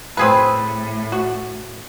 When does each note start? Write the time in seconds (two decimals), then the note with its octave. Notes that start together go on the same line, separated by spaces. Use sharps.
0.17 A2 C4 G#4 B4
1.12 F#4